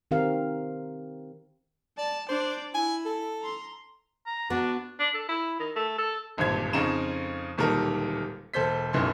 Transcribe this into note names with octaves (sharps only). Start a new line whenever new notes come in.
D#3 C4 G4 A#4 F5
D5 A5
D4 C5 D5
E4 G#5
A4
A#5 C6
A#5
B3 D4 F#4 B4
D4
A4
E4
D#3
A3
A4
D1 G#1 G2 A#2 C5 G#6
F2 C#3 D#4 A#5 E7
D1 A#2 D#3 G3 A4 A#4
E1 A4 C5 G6 B6
E1 B1 F#2 E3 A4 C6